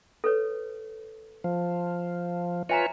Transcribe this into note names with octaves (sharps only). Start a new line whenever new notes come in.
A4 B4 C#5
F3
F4 B4 C#5 E5 G#5 A#5